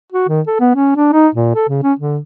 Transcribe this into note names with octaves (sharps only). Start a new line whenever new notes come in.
F#4
D#3
A4
B3
C#4
D4
D#4
A#2
A4
C#3
C#4
D3